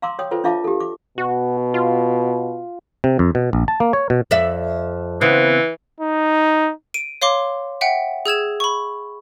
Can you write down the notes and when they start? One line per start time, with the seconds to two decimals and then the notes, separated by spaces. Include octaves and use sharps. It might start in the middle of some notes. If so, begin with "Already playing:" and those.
0.02 F5 A#5 C6 D6 E6
0.19 C#5 G5 D#6
0.31 F4 A4 B4 C5 G5
0.44 D4 F4 E5 F5 A5 D6
0.64 G4 A4
0.80 D6
1.18 B2 F#4
1.74 F4
3.04 C3
3.19 F2
3.35 B2
3.53 A#1
3.68 A5
3.80 A#3
3.93 C#5
4.10 B2
4.31 F2 D5 E5
5.21 C#3 E3 B3 C4
6.00 D#4
6.94 D7 D#7
7.21 C#5 F5 C6 D6
7.81 E5 F#5 G5
8.26 G#4 E6 G#6 E7
8.60 B5 C#6